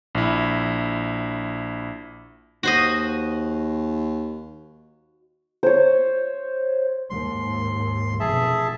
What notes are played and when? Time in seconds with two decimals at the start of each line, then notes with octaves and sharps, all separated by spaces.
0.15 A#1 E4
2.63 D#2 F#4 C5 D#5
5.63 C5 C#5
7.10 D#2 G#2 C6
8.20 F1 F#2 B2 G#4 E5 A5